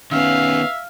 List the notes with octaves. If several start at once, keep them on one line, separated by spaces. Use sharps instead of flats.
D#3 B3 C#4 E5 F5